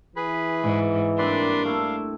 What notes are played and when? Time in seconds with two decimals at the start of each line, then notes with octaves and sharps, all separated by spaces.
0.16 E3 G#4 B4 B5
0.64 G#2 D5 D#5
1.18 G2 A#3 C4 D4 B4 D5 C6
1.65 A3 E4 F5